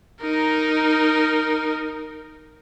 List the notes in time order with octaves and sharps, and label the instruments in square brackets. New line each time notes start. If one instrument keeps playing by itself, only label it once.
[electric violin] D#4 A#4